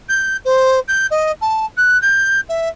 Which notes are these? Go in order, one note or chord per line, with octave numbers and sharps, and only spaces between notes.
G6
C5
G6
D#5
A5
F#6
G6
E5